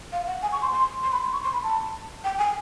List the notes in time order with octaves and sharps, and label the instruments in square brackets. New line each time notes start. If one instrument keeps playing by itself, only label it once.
[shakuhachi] F5
F#5
G#5
C#6
C6
C6
C6
B5
C6
C#6
C6
B5
A5
G5
G#5